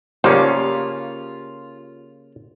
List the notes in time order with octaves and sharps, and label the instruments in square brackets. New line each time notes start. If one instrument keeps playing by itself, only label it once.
[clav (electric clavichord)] C#3 A#3 C#4 [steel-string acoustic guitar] F4 [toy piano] G4 A5 [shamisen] C5 D5